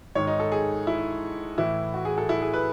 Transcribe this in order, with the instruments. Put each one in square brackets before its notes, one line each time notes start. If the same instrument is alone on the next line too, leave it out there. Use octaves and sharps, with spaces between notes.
[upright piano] G#2 D#3 C#5
D#4
A4
G#4
E4
A2 E3 E4
F#4
G#4
A4
E4
G#4
B4